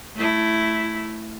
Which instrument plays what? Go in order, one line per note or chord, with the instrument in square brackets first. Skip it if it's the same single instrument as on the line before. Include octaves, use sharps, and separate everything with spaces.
[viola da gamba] A3 E4